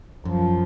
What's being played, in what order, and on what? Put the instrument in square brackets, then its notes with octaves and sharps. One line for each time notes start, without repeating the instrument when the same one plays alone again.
[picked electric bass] F#2 [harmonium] F3